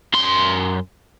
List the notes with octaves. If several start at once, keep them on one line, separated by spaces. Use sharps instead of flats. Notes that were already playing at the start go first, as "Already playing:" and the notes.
F#2 C6